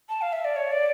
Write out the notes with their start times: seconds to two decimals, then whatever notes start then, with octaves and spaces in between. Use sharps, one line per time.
0.09 A5
0.22 F5
0.33 E5
0.45 D5
0.56 C#5
0.71 D5